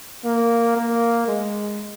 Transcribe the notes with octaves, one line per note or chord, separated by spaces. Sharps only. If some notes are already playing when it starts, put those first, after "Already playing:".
A#3
A#3
G#3